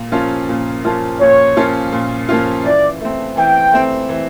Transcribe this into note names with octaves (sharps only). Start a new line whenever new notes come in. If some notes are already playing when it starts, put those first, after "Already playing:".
Already playing: A#2
F3 A#3 C#4 F4
A#2
F3 A#3 C#4 F4
A#2 C#5
F3 A#3 C#4 F4
A#2
F3 A#3 C#4 F4
E3 D5
A3 C4
E3 G5
A3 C4
E3